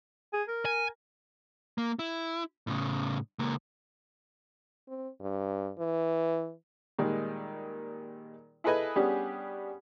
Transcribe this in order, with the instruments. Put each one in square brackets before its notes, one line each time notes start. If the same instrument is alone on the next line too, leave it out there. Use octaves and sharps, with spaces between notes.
[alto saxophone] G#4
A#4
[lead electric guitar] G#5
A#3
E4
A2 C#3
C#2 A#3
[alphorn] C4
G2
E3
[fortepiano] A#2 D#3 G3 G#3
E4 G#4 A4 B4 D#5 G#5
G3 B3 C#4 D4 G4 G#4